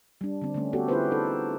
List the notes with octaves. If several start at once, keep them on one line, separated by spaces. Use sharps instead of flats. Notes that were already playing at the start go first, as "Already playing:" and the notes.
G3 D4
D3 C4
D3 A3 C#4
A3 B3 F#4 G4 A4
E4 F4 G4 G#4 B4 C5
D#4 A4